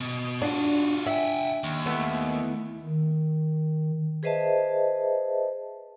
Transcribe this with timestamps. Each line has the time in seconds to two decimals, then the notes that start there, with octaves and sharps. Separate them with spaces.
0.01 B2
0.42 D4 F4 F#4
1.07 E5 F#5 G5
1.64 D#2
1.86 A3 B3 E4
2.85 D#3
4.23 G#4 B4 C5 D#5 E5 A5